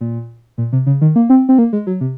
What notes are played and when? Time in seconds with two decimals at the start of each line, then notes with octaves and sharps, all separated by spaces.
0.01 A#2
0.58 A#2
0.73 C3
0.86 C#3
1.01 D#3
1.16 A#3
1.30 C4
1.49 C4
1.58 A#3
1.73 G#3
1.87 F#3
2.01 C3